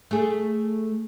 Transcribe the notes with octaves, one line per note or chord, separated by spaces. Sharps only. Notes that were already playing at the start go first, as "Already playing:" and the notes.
A3 G#4